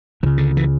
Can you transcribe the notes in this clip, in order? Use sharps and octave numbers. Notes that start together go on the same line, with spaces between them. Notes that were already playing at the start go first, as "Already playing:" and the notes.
C#2 C#3 D3
D3
E3